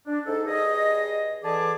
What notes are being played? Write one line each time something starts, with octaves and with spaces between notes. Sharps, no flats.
D4
G#2 D#4 A4
G2 G#4 D#5
D3 E3 G#4 A5 D6